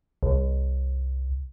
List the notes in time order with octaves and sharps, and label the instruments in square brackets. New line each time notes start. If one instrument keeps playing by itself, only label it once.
[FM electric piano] C2